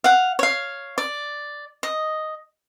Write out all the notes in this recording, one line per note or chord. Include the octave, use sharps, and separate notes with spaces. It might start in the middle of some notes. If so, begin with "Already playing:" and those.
F5 F#5
C#5 F5
D5
D#5